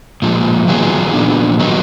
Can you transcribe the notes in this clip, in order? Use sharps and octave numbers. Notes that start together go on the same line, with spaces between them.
A#2 F3 G#3
D#3 F#3 B3 F4 G#4
A#2 F3 B3 D4
D#3 F#3 B3 D#4